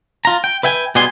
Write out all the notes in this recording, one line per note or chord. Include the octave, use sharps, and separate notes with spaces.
F4 A#5
G5
B4 E5 G5 G#5
B2 G3 B3 G#4 G#5 C6